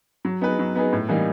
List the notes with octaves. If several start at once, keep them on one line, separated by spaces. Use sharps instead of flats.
F#3
B3 D#4 G#4 B4
F#3
B3 D#4 G#4 B4
A2
E3 G3 A#3 D#4